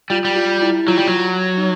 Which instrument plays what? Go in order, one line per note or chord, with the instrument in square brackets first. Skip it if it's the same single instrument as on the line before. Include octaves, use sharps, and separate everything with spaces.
[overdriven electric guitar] G3 [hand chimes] F4
[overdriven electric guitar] G3
[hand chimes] F4
E4
[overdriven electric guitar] F#3 [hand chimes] F4
[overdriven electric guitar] G3
F#3
[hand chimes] D#4